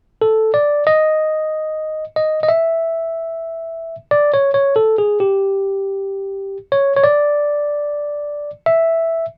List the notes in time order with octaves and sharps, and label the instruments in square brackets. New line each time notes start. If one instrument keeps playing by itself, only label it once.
[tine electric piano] A4
D5
D#5
D#5
D#5
E5
D5
C#5
C#5
A4
G#4
G4
C#5
C#5
D5
E5